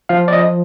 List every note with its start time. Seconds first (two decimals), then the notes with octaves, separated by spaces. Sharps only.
0.09 F3 F5
0.28 D5
0.33 D#5